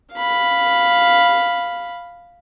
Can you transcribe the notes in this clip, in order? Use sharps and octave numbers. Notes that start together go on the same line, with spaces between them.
F5 B5